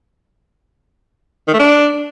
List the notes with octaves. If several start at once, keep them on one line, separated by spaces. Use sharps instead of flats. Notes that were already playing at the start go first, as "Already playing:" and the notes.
D#3
A3
D4